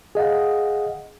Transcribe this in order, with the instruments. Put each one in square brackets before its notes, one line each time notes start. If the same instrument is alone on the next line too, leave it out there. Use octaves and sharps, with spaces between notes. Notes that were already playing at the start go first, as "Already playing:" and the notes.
[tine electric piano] G#4 D#5 F5 F#5